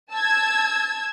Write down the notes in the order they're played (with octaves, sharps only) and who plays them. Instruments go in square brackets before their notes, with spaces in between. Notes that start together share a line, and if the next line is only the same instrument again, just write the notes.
[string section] A5 E6 G#6